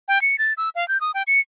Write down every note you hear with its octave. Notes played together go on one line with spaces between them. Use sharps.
G5
C#7
A6
E6
F5
G6
D#6
G5
C#7